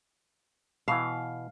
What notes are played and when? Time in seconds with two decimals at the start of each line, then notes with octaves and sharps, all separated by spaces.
0.88 B2 E3 F5